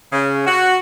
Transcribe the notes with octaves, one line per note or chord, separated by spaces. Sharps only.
C#3
F#4